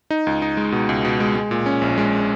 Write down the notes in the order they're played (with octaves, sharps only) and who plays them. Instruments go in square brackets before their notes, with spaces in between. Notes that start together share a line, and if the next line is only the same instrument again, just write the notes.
[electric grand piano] D#4
C#2
D#4
G#3
B2
C#2
B2
G#3
G#3
A#2
C#4
A#1
G#3